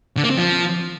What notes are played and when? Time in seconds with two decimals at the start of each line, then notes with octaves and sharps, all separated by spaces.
0.17 D3
0.24 A#3
0.31 C4
0.37 F3